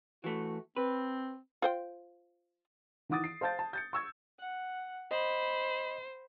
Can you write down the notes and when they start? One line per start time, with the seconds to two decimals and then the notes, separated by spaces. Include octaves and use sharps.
0.24 E3 A3 F#4
0.76 C4 B4
1.62 F4 C5 G5
3.09 D#3 E3 F#5 D6 D#6 A6
3.24 C7 D7
3.41 C5 F5 A5 G6 A6
3.59 A5
3.73 G6 A6 C#7
3.93 C#6 E6 G#6
4.39 F#5
5.11 C5 D#5 B5